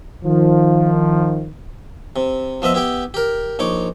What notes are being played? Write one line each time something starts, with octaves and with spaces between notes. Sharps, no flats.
D#3 F3
C3
F3 B3 D#5 E5
B3 E4 G4 G5
G4 A#4
A#1 D#4 C#5 D6